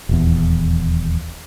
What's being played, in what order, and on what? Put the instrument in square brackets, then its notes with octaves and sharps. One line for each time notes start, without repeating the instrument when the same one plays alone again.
[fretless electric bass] D#1 E2